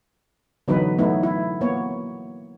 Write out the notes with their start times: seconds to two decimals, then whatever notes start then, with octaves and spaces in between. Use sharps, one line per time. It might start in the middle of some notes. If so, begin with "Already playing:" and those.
0.68 D3 E3 F#3 B3 D#4 B4
0.99 F#3 A3 B3 D#4 E4
1.23 E4
1.61 A#3 B3 C#5